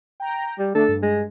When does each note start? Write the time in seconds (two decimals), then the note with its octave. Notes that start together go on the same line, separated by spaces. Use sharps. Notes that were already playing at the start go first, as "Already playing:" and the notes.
0.20 G5 A#5
0.59 G3
0.75 D3 A3 D4 A4
0.88 G2
1.03 G#3